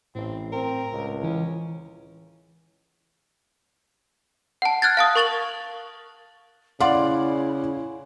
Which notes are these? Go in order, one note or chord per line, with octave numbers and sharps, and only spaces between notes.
A1 A2 C4
C4 A#4
C#2
E3 C#4
F#5 A5
F6 F#6 G#6 A6
F5 A5 D#6
A#4 C#6 A6 F7 F#7
C#3 E4 D5 F5 F#5 C6